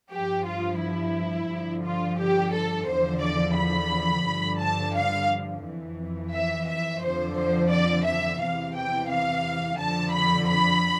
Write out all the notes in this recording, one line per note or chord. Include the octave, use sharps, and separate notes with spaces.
G2 F3 G4
F4
E4
G2 D3 F3
F4
G4
A4
E2 D3 F3 C5
D5
B5
G2 D3 F3
A5
F5
F2 E3
E5
E5
F2 D3 F3 C5
C5
D5
E5
E2 C3 E3 F5
G5
F5
F2 D3 F3 A5
B5
B5